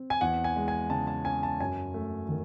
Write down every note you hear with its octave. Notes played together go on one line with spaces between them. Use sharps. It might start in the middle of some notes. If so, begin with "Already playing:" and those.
Already playing: C4
G#5
E2 F#5
G#5
G#3
G#5
C#3 A5
A5
C#4 G#5
A5
F#2 G#5
A3
D#3